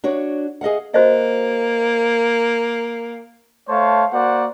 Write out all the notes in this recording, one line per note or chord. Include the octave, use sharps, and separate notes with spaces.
D4 F#4 C#5
G#4 D#5 F5 F#5
A#3 F#4 C5 D#5
A3 C5 C#5 F5 A5
A#3 F#4 C5 D5 F#5